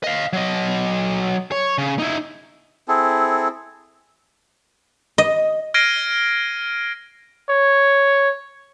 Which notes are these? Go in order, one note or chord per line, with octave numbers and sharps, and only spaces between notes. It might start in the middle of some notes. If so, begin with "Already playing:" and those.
D#5 F5
F#3 D#5
C#5
C#3
D#4 E4
C4 E4 G#4 A4
D#5
F6 G#6 A#6 C7 D7 D#7
C#5